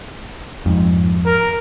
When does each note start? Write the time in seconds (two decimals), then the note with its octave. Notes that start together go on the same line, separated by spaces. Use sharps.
0.66 F2 G#2
1.26 A#4